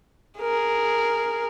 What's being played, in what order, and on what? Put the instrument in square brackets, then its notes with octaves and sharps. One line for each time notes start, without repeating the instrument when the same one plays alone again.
[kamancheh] G#4 A#4